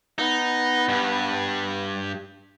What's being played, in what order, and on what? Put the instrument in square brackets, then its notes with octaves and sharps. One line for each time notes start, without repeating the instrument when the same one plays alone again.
[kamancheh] B3 [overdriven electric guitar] D#4
[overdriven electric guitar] G2